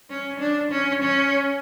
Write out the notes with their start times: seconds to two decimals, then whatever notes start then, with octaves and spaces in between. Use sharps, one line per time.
0.10 C#4
0.40 D4
0.71 C#4
1.02 C#4